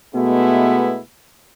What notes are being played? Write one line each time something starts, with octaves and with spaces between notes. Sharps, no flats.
B2 G#3 A3 B3 E4